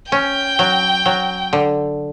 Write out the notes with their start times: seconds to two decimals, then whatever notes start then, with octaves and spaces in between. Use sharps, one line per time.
0.12 C#4 G5
0.59 F#3
1.06 F#3
1.53 D3